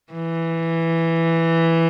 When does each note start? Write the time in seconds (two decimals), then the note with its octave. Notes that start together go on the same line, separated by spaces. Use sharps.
0.13 E3